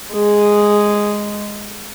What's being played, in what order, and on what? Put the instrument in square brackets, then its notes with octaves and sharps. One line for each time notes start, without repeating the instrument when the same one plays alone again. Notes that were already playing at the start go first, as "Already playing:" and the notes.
[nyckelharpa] G#3 G#4